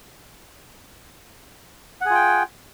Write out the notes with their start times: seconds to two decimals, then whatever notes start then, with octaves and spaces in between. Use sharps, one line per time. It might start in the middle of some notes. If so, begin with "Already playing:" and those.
2.01 F#5
2.06 G#4
2.10 F4
2.15 G5